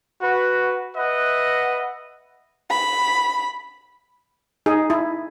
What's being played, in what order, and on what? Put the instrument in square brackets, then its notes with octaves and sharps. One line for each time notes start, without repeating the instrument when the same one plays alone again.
[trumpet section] F#4 B4
B4 D#5 E5 F#5
[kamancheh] B5
[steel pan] D#4 G#4
E4